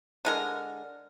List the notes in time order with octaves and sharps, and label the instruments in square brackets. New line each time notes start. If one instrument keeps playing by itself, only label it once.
[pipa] D3 G#3 A#4